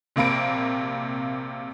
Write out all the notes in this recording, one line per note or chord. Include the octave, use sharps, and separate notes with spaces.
A#1 C3 A#3 B5 D7